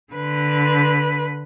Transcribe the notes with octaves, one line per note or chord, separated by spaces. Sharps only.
D3 B4